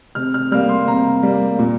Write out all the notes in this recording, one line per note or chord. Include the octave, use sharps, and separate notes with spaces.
C3 F6
F6
G3 A#3 F6
C6
C3 A#5
G3 A#3
A#2